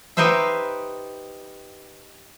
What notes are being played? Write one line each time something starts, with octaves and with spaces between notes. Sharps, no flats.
D#4 G4 B4 C5 E5